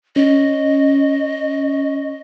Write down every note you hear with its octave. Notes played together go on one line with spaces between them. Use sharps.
C#4 D#5